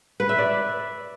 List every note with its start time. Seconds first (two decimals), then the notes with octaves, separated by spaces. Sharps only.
0.20 B4
0.29 E5
0.39 D5